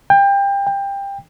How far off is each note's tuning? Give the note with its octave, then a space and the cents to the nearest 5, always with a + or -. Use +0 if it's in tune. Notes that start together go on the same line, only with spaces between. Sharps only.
G5 +25
G5 +20